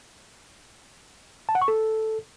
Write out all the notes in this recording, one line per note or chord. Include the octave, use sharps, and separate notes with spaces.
A5
F#5
C#6
A4